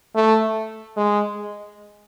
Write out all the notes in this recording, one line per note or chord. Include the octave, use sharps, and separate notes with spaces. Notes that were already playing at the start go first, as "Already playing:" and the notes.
A3
G#3